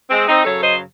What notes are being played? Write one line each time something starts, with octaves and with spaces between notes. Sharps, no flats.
G#3 C4
C4 D#4
F#2 C#3 F#3 A4 C#5
C5 D#5